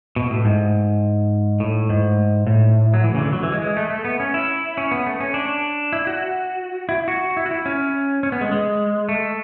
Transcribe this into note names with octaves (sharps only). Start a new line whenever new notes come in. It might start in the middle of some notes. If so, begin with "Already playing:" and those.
B2
A2
G#2
A2
G#2
A2
F#3
E3
C#3
D3
F#3
E3
G#3
G#3
A3
A3
B3
C#4
E4
C#4
B3
A3
C#4
D4
E4
F#4
E4
F#4
E4
F#4
E4
C#4
C#4
B3
G#3
G#3
A3